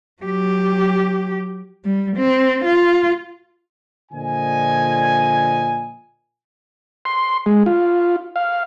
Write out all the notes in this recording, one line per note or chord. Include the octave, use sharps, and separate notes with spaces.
F#3 G4
G3
C4
F4
A#2 D3 F3 D#5 G#5
C6
G#3
F4
F5